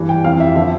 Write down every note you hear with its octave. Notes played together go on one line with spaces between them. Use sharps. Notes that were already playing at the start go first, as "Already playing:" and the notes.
Already playing: G2 E3
G5
F2 E3 F5
E5
D3 F3 E5